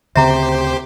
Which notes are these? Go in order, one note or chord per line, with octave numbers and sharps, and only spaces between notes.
D2 C#3 C4 G4 C5 E5 A#5